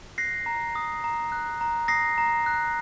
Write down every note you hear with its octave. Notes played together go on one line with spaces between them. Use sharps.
F#6 A#6 C7
A#5
D#6
A#5
F#6
A#5
D#6 A#6 C7
A#5
F#6